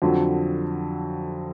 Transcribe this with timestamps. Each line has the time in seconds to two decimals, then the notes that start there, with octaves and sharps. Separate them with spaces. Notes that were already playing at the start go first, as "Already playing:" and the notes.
0.02 F2 D3 F#3